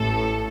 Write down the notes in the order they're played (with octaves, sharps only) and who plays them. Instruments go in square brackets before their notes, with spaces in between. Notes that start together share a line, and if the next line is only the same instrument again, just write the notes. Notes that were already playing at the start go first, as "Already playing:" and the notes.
Already playing: [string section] A1 A2 A4